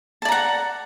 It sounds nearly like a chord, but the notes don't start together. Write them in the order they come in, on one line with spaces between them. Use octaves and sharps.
A5 D5 A#5 F#5